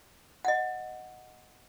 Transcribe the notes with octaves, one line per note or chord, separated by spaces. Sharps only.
D#5 F#5